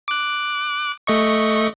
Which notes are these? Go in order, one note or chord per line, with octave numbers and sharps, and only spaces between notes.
D6 F#6
A3 D#5 C#6